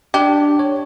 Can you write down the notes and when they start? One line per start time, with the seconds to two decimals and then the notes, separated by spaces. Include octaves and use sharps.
0.14 D4 G4
0.59 C#5